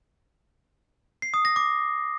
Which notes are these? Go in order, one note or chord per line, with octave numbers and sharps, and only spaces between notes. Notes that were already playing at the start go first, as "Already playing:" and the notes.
C7
D#6
A#6
D6